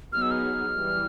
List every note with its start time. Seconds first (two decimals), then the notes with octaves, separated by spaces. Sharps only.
0.13 F#3 B3 D#4 G#4 F6
0.22 E6
0.31 F6
0.76 E3 G3